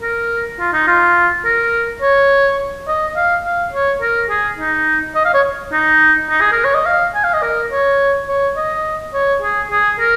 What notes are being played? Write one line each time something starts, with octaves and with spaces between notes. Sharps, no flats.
A#4
F4
D#4
F4
A#4
C#5
D#5
F5
F5
C#5
A#4
G#4
D#4
D#5
F5
C#5
D#4
D#4
G#4
A#4
C#5
D#5
F5
G#5
F5
D#5
A#4
C#5
C#5
D#5
C#5
G#4
G#4
A#4